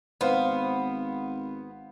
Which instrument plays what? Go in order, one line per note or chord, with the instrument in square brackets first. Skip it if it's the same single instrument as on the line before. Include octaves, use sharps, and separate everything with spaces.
[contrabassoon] G#1 [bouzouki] B3 [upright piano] B4 C5 F5